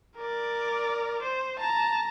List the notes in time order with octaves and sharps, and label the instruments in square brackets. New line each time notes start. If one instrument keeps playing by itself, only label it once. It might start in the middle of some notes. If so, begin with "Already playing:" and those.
[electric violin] A#4 D5
C5
A5 A#5